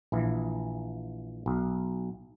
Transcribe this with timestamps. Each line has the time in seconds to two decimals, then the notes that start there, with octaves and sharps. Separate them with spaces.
0.12 A#1 E3
1.46 B1